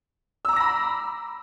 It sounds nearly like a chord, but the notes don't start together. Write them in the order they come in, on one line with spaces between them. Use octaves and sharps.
E6 A#5 D6 A#6 B5